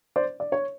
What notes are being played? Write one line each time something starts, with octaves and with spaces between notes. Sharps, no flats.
C5 D5
D5
C#5